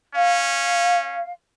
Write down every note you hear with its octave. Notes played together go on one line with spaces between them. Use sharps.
C#4 F5